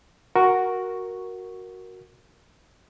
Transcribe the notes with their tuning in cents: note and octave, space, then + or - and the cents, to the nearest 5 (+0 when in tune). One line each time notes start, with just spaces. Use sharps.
F#4 +0 A#4 +0 C#6 -5